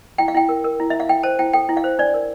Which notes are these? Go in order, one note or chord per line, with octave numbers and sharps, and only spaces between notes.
E4 G5
F5
E4 G5
A#4
A#4
E4
E4 E5
F5
E4 G5
C5 A5
E4 G5
A4 G5
E4
F5
C5
D4 D5
A#4